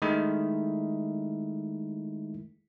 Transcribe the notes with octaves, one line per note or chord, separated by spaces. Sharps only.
D#3 G#3 A3 E4